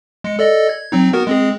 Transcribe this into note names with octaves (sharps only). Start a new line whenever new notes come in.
G#3 C#7
A4 D5 D#5
G#6
F#3 C4 D#4
B3 F#4 A#4
G#3 C4 G#4